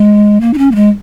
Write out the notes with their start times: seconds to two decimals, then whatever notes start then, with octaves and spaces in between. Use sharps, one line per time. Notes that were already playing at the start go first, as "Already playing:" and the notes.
Already playing: G#3
0.41 A#3
0.54 D#4
0.58 C#4
0.71 A#3
0.75 G#3